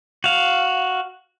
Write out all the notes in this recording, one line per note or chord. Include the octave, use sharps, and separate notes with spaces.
F#4 F5